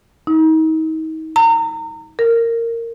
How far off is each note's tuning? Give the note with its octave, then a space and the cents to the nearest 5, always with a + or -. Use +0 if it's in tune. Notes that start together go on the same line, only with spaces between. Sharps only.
D#4 +35
A#5 -30
A#4 -15